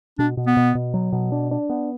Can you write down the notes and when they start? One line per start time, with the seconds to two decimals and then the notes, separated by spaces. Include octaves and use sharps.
0.19 B2 D4
0.37 B2
0.47 B3
0.57 B2
0.75 B2
0.94 F#3
1.12 B2
1.32 D4
1.51 D4
1.70 B3